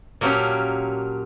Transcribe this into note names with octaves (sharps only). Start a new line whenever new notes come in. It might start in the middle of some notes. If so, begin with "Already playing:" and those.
A#2 F#3 A#3 C#4 D4 G4